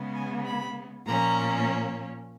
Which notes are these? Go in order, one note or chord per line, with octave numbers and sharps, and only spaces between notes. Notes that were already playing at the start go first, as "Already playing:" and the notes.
Already playing: C#3 G#3 B3
G#5
B5
A#2 F3 A#3 C#4 A#5